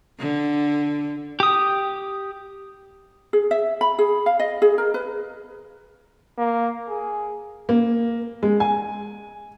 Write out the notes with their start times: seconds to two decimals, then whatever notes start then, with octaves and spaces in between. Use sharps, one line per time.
0.19 D3
1.40 G4 D#6
3.33 G#4
3.51 E5
3.81 B5
3.99 G#4
4.26 F5
4.40 D#5
4.62 G#4
4.78 A#4
4.94 B4
6.38 A#3
6.88 G#4
7.69 A#3
8.43 G#3
8.60 G#5